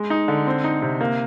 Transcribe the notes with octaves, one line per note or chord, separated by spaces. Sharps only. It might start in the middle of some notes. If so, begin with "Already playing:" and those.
Already playing: G#3
D#4
D3
C4
D#4
C3
A#3